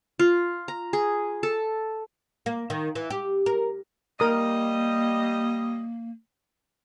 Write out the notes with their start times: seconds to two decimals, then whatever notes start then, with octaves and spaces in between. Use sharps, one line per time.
0.19 F4
0.68 A#5
0.93 G#4
1.43 A4
2.46 A#3
2.70 D#3
2.95 E3
3.10 G4
3.46 A#4
4.20 G3 A#3 A#4 D#5 D#6